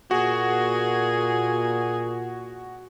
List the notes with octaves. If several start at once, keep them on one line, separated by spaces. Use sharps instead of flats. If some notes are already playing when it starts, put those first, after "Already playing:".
A#2 F#4 G#4